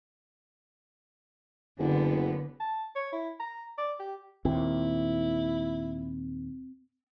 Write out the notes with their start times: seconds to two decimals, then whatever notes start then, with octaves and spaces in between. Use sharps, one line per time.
1.79 F#1 D3 B3
2.60 A5
2.95 C#5
3.12 E4
3.40 A#5
3.78 D5
4.00 G4
4.45 D#2 A#2 C4 E4